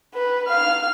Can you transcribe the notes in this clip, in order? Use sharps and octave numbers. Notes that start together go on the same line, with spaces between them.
B4
F5 F6